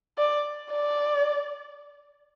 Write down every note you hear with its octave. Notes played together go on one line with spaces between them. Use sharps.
D5
D5